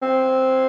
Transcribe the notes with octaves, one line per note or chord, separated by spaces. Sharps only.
C4